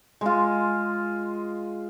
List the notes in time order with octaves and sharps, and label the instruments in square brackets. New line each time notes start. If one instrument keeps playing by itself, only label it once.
[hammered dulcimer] G#3 F4